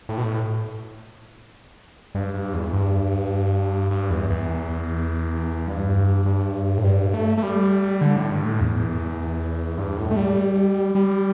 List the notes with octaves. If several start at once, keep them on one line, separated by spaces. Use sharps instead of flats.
A2
B2
A2
G2
G2
E2
G2
G2
E2
E2
G2
G2
A2
G2
A3
A3
G3
D3
A2
G2
A2
E2
G2
A2
A3
G3
G3